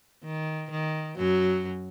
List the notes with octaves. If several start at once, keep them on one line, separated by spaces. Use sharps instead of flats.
D#3
D#3
F#2 F#3